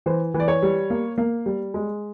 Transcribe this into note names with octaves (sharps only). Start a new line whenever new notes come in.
E3 C5
E3
D5
C#5
G3
A#3
A#3
G3
G#3